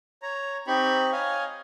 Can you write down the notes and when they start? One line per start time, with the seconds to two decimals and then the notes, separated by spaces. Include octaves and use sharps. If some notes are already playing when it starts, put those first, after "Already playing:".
0.22 C#5 A#5
0.67 C4 D#4 G4 B5 C#6
1.12 C#5 D#5 F5 G#5